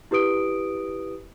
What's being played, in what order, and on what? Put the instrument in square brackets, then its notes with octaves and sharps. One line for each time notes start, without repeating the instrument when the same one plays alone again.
[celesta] E4 G4 B4 D#6 D7